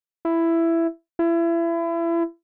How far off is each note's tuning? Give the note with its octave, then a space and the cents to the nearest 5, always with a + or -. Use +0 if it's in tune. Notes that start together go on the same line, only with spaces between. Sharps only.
E4 +10
E4 +30